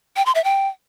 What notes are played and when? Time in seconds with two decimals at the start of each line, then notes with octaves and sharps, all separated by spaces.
0.17 G5
0.26 C6
0.35 E5
0.44 G5